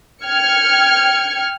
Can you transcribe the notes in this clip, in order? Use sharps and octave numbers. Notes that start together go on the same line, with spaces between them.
G5 F6 G#6 C#7